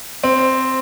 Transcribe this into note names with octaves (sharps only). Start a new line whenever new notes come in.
C4